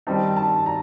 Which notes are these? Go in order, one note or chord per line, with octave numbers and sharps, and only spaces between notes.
D#3 G3 C4 D#4 A5
A5
A#5